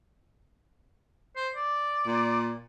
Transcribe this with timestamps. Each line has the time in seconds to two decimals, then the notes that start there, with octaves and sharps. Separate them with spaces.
1.36 C5
1.56 D5
2.06 A#2